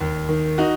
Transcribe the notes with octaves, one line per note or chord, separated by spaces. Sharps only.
D#2
D#3
D#4 F#4